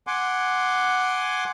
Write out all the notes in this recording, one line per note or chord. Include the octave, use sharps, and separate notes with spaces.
F#5 G#5 C6 D6